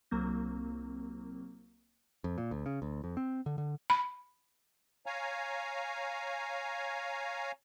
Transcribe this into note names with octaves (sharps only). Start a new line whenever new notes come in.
C2 F#3 A#3 C4
F2
A#2
D2
C#3
D2
F2
C4
D3
D3
B5
C#5 F5 G#5 A#5